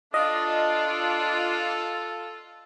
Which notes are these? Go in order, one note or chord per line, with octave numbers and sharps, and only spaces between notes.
D4 F4 A4 D#5